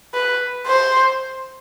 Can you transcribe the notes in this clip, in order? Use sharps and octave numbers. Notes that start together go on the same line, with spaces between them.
B4
C5